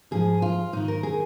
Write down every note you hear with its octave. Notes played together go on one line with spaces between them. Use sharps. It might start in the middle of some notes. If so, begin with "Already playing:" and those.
G#2 F3 G#4
F4
G#2 D#3 D#4
A#4
G#4